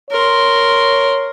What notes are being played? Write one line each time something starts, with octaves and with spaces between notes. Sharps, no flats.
A#4 C#5 C6